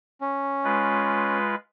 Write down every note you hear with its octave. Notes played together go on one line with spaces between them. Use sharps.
C#4
G#3 F4 B4